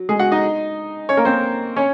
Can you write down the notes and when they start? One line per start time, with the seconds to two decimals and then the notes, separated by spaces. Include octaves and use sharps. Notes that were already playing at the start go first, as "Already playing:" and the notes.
Already playing: F#3
0.09 G#3 G#4
0.20 F#4 F#5
0.32 D#4 D#5
1.09 C#4 C#5
1.17 A#3 A#4
1.25 C4 C5
1.76 C#4 C#5